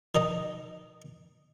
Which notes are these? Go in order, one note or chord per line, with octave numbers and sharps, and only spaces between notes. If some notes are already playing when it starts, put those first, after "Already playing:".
D#3 D#4 D#5